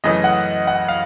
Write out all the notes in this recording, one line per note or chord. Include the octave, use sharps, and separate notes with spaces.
F#2 C#3 E3 A3 C#4 D#5
F#5
F#5
F5